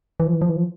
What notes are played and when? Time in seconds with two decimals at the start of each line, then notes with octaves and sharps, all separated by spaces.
0.20 E3
0.27 F3
0.33 E3
0.42 F3
0.49 E3
0.56 F3